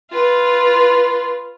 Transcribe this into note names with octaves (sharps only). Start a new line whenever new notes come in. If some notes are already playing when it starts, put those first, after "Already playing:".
F4 B4